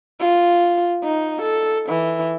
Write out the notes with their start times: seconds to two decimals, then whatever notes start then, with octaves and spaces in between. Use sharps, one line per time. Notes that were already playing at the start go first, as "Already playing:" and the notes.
0.20 F4
1.04 D#4
1.42 A4
1.89 E3